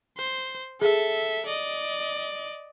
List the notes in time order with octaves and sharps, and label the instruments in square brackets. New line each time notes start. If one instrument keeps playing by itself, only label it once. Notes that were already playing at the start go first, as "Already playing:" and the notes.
[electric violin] C5
[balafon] G#4 [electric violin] A4 E5
[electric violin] D5 D#5